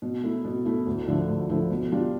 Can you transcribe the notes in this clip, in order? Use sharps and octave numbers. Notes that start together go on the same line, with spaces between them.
B2
A3 E4
B2
A3 E4
D2
D3 F3 A3 E4
D2
D3 F3 A3 E4
B2
G3 D4 F4